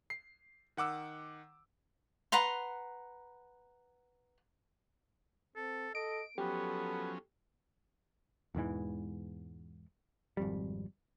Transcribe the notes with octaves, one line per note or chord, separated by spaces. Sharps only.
C7
D#3 F#5 D6 E6
B4 F#5 A#5 C6
C4 A4
A4 D#5 D7
F3 F#3 B3 C#4 G4 A4
E1 E2 G#2 E3
G#1 F2 G3